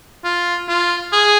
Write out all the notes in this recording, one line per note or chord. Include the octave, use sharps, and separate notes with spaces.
F4
F4
G#4